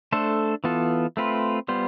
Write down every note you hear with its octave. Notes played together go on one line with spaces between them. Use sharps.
A3 D4 A4 C5
E3 B3 F4 A4
A3 C4 F4 B4
G3 B3 F4 C5